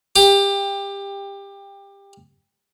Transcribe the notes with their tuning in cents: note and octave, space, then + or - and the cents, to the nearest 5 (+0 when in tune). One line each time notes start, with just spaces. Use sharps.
G4 +20